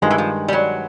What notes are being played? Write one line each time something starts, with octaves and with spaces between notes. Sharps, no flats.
G2 D#3 F3 G#3
E3
F3
G3
F#3